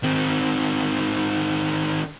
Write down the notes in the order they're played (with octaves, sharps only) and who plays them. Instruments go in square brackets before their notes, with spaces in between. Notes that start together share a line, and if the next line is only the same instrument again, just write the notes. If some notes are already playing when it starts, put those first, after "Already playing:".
[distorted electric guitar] D#3 C4